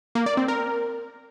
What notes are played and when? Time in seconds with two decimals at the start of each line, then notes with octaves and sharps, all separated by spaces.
0.15 A#3
0.26 D5
0.37 C4
0.48 A#4